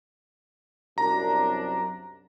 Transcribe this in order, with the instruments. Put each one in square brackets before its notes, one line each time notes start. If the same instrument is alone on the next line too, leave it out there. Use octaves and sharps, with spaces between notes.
[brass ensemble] C2 F#2 D4 [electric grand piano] A#5